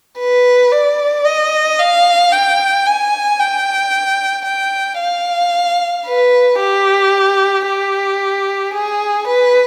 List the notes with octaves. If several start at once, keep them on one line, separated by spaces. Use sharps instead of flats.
B4
D5
D#5
F5
G5
G#5
G5
G5
F5
B4
G4
G4
G#4
B4